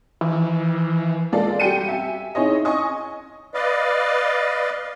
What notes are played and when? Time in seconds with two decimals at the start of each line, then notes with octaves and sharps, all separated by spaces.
0.21 E3
1.32 G#3 A#3 F4 A4 D5
1.60 G3 F#4 G5 C#7 D#7
1.89 E5 G#5
2.35 D#4 E4 G#4 C#5 D#5
2.65 D#5 G#5 C#6 D#6
3.54 B4 D5 D#5 F5